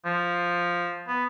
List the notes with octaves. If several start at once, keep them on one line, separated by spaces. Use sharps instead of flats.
F3
B3